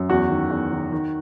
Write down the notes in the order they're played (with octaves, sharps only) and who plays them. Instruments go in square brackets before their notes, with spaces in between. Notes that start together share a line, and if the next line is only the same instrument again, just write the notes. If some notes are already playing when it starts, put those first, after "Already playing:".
Already playing: [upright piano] F#2
E2 F#4
D#3
E2
D#3
D#3